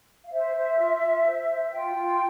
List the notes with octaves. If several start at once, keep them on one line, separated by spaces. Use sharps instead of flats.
F5
C5 E5
C5
F4
F4
C5
C5
F4 G5
F4